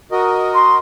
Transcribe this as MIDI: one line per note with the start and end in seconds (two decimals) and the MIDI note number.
0.12 0.78 66
0.12 0.78 70
0.12 0.78 75
0.55 0.77 84